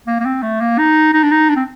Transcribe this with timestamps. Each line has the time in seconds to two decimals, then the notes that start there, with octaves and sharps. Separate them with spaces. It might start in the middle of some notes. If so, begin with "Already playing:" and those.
0.07 A#3
0.20 A#3
0.25 C4
0.43 A3
0.61 A#3
0.78 D#4
1.13 D#4
1.23 D4
1.31 D#4
1.49 D4
1.56 C4